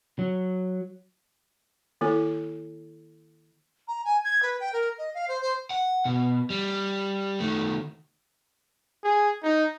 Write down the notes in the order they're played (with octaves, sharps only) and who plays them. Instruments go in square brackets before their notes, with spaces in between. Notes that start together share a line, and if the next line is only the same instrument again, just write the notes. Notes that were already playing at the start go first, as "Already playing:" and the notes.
[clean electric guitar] F#3
[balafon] D#3 A#3 E4 A4
[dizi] A#5
G#5
G#6
B4
G5
A#4
D#5
F5
C5
C5
[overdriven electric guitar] F#5
B2
G3
D#3 A3
[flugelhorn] G#4
D#4